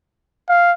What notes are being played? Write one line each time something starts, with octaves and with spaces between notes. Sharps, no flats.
F5